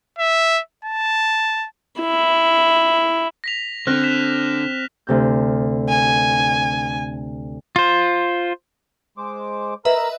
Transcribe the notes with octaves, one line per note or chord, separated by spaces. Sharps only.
E5
A5
E4
A#6 B6 F7
D3 C4 F6 F#6 A#6
B6 E7
D2 C3 G6
G#5
F4 C5
G#3 C5 D6
A#4 B4 D#5 E5 A#5